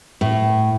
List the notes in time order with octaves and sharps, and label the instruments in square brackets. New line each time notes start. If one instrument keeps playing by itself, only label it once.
[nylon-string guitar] A2